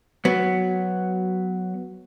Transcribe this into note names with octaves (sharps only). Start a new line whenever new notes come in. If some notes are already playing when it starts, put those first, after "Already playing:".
F#3 B3